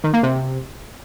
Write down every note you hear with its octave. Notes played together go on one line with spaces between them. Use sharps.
D#3
A#3
C3